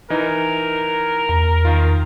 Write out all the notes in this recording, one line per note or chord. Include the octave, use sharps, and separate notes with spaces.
E3 D#4 A#4
E2 A#5
D#3 F4